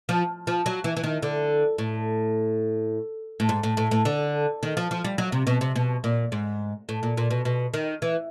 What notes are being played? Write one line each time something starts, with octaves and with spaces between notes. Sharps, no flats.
F3
F3
F#3
E3
E3
D#3
D3
A2
A2
G#2
A2
A2
A2
D3
D#3
F3
F3
G3
F#3
C3
B2
C3
B2
A#2
G#2
A2
A#2
A#2
B2
B2
D#3
E3